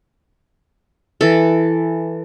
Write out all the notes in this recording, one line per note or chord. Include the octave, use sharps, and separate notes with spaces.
E3 A4